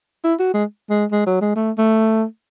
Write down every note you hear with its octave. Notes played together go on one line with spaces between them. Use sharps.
E4
F#4
G#3
G#3
G#3
F#3
G#3
A3
A3